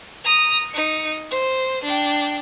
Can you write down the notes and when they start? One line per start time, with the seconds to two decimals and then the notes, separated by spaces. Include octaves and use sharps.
0.24 A#5 D#6
0.71 D#4 C#7
1.31 C5
1.84 D4 G5